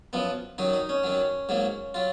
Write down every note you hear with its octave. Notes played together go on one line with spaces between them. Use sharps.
F#2 F3 B3
F#2 D#3 F#3 D#4
D#4
C#4
F#2 D#3 F#3
G#2 F#3 A#3
F#3 F4